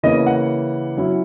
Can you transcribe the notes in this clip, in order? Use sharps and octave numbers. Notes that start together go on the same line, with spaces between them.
C#3 E3 A#3 C#4 D#5
F#5
F#3 C#4 E4